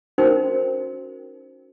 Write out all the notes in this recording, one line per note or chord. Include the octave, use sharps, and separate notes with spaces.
C#4 D#4 F#4 A#4 C5 G5